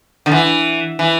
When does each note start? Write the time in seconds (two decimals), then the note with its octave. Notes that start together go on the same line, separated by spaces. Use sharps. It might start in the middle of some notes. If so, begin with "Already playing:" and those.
0.26 D3
0.32 E3
0.99 E3